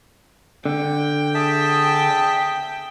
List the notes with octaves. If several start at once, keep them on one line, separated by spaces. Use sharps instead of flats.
D3 G5
G#4 E5 A5